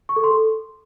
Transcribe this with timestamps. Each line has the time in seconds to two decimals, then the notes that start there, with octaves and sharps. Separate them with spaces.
0.09 C#6
0.16 A4
0.24 C6
0.31 A4